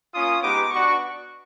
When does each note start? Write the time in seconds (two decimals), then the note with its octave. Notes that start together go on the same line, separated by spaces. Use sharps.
0.14 A#3 C#4 F4 D#6
0.42 G#3 B3 D#4 G4 D6
0.70 B3 D4 F#4 C#6